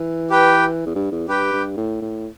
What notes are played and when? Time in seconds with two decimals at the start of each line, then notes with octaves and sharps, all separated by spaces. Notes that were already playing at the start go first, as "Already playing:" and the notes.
Already playing: E3
0.30 G4 B4 G5
0.86 E2
0.95 G2
1.12 E2
1.28 G2 G4 B4 G5
1.52 G2
1.77 A2
2.02 A2